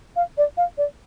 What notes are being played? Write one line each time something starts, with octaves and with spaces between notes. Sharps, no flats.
F5
D5
F5
D5